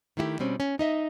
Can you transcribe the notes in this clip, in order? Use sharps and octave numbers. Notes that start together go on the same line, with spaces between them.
D#3 A3 E4 F#4 G4
B2 G3 C4 C#4
C#4
D#4 D#5 E5